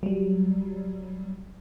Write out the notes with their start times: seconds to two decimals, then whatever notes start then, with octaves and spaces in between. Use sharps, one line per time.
0.03 F#3 G3